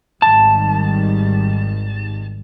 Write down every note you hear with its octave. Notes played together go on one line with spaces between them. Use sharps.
G#1 D#3 G3 A5